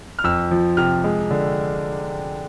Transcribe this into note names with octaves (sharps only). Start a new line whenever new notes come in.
F6
F2 E6
F3
C3 F6
G#3
D3